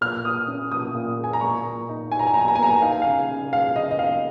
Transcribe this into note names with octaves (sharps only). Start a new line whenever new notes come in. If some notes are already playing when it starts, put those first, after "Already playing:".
A#2 F6
A#2 D#6
C#4
A#2 D#6
A#2
G#3
G#5
A#5
A#2 C#6
A#2
D#4
D#4 G#5
A#5
G#5
D#4 A#5
G#5
A#5
G#5
A#3 A#5
G#5
D#4 F5
G#5
C#3 F5
C#3
G#3 F5
C#3 D#5
D#5
D#4 F5